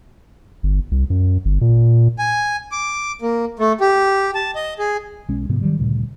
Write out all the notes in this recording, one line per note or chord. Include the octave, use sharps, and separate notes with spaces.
G1
C2
F#2
G1
A#2
G#5
D6
A#3
A3
G4
A5
D#5
G#4
B1 G#3 C#4
G#2 C3 F3 B3
D#3 F#3 G3
D2 G2 A#2 C#3